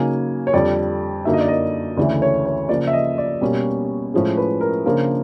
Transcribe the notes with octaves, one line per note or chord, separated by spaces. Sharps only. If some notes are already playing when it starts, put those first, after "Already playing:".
Already playing: C#3 F#3 A#3 D#4 G#5
C#5
F2 D3 G3 D5
F#2 D3 F#3 A#3 D#4 E5
D#5
D5
D#5
D2 C#3 E3 A3 D5
C#5
C#5
C#3 F3 A#3 D5
E5
D#5
D5
B2 G3 A#3 C#4
A2 F3 G#3 C#4
B4
A#4
C#3 F3 A#3 D4 F4 A#4